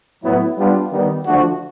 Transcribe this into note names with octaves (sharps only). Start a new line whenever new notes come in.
A2 F#3 B3 E4
G3 B3 D4 F4
D#3 G3 B3 D#4
D3 F3 A3 D4 F#4